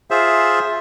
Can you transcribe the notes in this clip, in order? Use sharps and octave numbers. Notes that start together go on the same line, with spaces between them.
F4 G#4 C5 E5